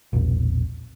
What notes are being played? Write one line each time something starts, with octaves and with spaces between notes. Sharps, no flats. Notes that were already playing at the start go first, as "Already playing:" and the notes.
E1 A#1